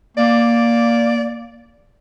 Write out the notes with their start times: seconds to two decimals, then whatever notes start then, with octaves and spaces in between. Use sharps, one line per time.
0.17 A#3 D5